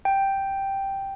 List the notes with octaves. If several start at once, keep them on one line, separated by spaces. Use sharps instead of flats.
G5